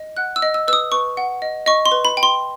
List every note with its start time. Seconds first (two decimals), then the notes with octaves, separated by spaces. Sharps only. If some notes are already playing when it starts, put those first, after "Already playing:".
Already playing: D#5
0.17 F#5 F#6
0.36 E6
0.42 D#5
0.54 E6
0.68 B4 E6
0.73 D#6
0.92 B4 C#6
1.17 F#5
1.42 D#5
1.66 D#5 C#6
1.86 C6
1.91 B4
2.05 B5
2.17 G5
2.23 C6